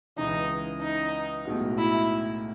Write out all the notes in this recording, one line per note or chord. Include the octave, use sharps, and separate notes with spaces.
C#2 C#3 E3 D#4
D#4
B1 A2 G#3 D#4 F#4
E4